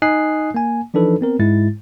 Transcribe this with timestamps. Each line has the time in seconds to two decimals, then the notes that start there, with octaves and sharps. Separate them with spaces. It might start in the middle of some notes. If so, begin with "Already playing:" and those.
0.02 D#4 D#5 G#5 D#6 F#6 C7
0.54 A#3 G#5
0.94 E3 F3 D4 D#4 A4 B4
1.21 B3 C4 A#4
1.39 G#2 G#3 E4 A6